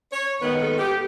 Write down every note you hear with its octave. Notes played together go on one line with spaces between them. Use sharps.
C#5
D#2 D#3 G#3 B3 B4
A4
G4